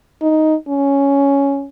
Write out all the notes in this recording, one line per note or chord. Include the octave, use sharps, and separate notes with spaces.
D#4
C#4